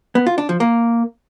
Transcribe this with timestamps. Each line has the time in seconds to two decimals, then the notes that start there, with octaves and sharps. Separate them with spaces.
0.15 B3
0.27 F4
0.38 D4
0.49 F3
0.60 A#3